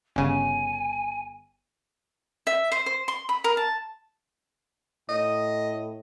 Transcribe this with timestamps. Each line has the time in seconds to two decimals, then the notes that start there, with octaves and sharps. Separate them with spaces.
0.16 G1 C#3 G#5
2.47 E5
2.72 C5
2.86 C5
3.08 C6
3.29 B5
3.44 A#4
3.57 A5
5.09 A2 D#5